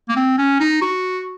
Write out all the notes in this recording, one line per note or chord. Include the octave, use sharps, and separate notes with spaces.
A#3
C4
C#4
D#4
F#4